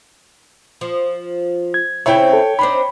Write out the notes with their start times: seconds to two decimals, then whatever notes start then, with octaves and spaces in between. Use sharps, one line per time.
0.81 F3
1.74 G#6
2.06 C#3 C4 E4 C#5 E5 G5
2.33 A4
2.59 C4 D4 D#4 B5